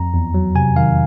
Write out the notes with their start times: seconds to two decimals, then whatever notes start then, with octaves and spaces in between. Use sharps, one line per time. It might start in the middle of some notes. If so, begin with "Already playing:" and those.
Already playing: F2 A#5
0.14 E2
0.34 F#3
0.55 C3 G#5
0.76 D#3 F5